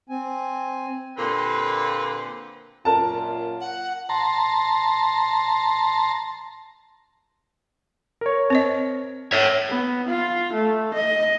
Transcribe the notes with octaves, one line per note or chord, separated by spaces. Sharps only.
C4 G#5
A#2 D3 A#3 C4 G4 B4
F#2 A#2 F4 A#4 A5
F#5
A5 A#5 C6
A#4 C#5
C4 C5 D#5
C#5 E5
B3
F4
A3
D#5